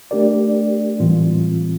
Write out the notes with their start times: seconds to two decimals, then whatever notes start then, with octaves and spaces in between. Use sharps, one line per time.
0.11 A3 D4 G4 A#4 D5
0.99 A2 E3 G3 C4 F4